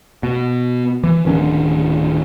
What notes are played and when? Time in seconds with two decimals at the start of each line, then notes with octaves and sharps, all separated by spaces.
0.23 B2
1.04 E3
1.25 D1 D#3 C#4 D4